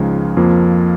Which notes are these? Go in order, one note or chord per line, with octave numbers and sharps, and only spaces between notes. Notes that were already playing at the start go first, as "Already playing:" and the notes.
Already playing: C#2 C#3 F3 G#3 D#4
F2 F3 A#3 F4